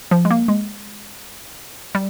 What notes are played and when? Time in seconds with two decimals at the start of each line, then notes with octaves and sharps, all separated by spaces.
0.11 F3
0.25 G#3
0.31 A#3
0.48 G#3
1.95 G3